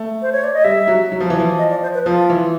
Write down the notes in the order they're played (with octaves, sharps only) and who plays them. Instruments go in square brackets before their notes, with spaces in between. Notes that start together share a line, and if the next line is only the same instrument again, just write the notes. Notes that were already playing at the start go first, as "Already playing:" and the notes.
Already playing: [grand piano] A3
[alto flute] C5
C#5
D5
D#5
[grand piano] G3 [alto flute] E5
[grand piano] F#3
F#3
F3
E3
F3
[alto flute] D#5
D5
C5
B4
[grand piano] F3 [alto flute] F4
[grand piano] E3